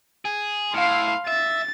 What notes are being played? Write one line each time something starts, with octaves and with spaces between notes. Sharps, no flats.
G#4
A2 F5 C6
E5 A6